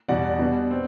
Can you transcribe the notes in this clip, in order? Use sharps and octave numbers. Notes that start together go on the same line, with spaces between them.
E2 B2 G3 D5 F#5
B2 G3 B3 D4
C4